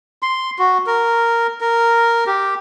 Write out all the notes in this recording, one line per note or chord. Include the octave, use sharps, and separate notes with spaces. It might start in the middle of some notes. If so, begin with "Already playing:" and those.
C6
F#4
A#4
A#4
G4